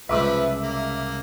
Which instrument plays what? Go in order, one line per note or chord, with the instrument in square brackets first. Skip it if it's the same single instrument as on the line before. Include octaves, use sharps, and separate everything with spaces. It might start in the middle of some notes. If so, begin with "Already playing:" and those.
[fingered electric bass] C2 C#3 G#3 [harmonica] F3 B4 [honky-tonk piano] E5 D6 E6
[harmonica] A#3